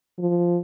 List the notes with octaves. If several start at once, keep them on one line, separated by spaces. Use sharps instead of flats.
F3